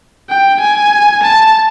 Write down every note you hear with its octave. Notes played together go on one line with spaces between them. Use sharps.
G5
G#5
A5